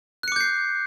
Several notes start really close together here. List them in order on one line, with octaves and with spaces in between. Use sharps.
F#6 C#7 D6 G6 C7